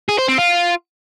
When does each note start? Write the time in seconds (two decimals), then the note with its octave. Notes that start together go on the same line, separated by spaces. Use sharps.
0.09 G#4
0.19 C5
0.28 C4
0.38 F4